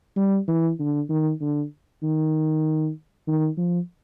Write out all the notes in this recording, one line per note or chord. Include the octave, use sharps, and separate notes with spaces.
G3
E3
D3
D#3
D3
D#3
D#3
F3